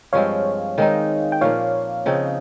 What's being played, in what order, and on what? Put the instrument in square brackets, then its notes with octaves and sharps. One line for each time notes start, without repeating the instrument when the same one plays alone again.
[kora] G2 F3 G#3 C4 [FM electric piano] C#5 F5
[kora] D#3 G#3 C4 D#4
[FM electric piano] G5
[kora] A#2 F3 A#3 [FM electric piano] C#5 F5
[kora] C#3 F3 C4 D#4